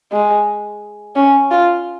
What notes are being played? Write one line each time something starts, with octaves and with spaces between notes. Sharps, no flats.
G#3
C#4
F4